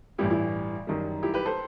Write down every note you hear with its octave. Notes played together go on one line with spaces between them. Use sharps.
A1 G2 E3 G3 E4 G4
E4
F#2 D#3 G3
E4 G4
G4 B4
A4 C5